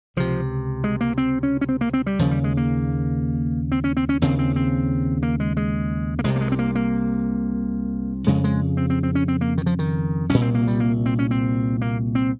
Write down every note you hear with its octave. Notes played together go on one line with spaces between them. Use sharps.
C#2 C3 F3
G#3
A#3
C4
C#4
C#4
C4
A#3
C4
G3
D#2 C#3 F3
G3
G#3
A#3
C4
C#4
C4
C#4
D#2 C#3 C4
C4
C4
A#3
G#3
G#3
A#3
C2 C3 G#3
A#3
G#3
C4
A#3
A#3
F2 C#3 G#3
G#3
C4
C4
C4
C#4
C4
A#3
D#3
F3
D#3
C2 A#2 C#4
C4
A#3
G3
A#3
C4
C#4
C4
A#3
C4